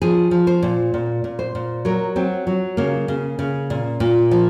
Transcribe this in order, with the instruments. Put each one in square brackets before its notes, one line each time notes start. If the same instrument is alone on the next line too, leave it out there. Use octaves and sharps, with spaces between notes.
[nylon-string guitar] F3 G#4
F3
C5
A#2
A#2
A#2
C5
A#2
F#3 A#4
F#3 C4
F#3
C#3 A#3
C#3
C#3
A#2
A#2
F3